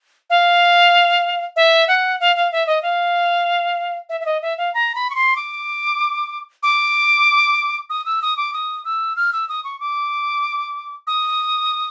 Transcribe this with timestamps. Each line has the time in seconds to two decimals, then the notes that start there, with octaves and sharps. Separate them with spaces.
0.30 F5
1.56 E5
1.88 F#5
2.20 F5
2.36 F5
2.52 E5
2.67 D#5
2.83 F5
4.09 E5
4.21 E5
4.26 D#5
4.42 E5
4.58 F5
4.74 A#5
4.95 B5
5.10 C#6
5.15 C6
5.36 D6
6.63 D6
7.90 D#6
8.06 E6
8.22 D#6
8.37 D6
8.54 D#6
8.85 E6
9.17 F6
9.33 E6
9.49 D#6
9.64 C#6
9.80 D6
11.07 D#6